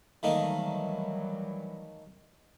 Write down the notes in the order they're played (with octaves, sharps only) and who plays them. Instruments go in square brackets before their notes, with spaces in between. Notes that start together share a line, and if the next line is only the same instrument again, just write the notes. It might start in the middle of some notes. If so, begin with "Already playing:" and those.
[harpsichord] D#3 A3 A#3 [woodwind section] E3 F#3 G3